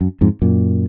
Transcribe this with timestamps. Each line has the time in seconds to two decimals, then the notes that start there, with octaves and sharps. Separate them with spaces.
0.01 F#2
0.21 F2 G#2
0.42 F#2 A#2